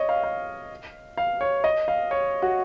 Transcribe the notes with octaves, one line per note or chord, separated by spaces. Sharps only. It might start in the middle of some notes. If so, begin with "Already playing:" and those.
Already playing: C#5 D#5
F5
F5
F5
C#5
D#5
F5
C#5
F#4